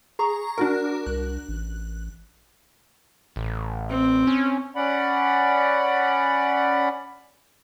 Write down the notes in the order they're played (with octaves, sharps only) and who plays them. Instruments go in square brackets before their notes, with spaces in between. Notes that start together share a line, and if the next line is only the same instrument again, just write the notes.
[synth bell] G#4 A#5 C#6
D4 F#4 A#4
[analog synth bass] C2 [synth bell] F#6
[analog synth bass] A1
[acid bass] A1
[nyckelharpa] C4
[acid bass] C#4
[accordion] C#4 D5 F#5 B5